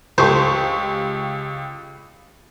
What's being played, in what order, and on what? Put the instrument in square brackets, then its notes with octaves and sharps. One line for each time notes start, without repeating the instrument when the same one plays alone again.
[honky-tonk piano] C#2 G4 C#6 [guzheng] C5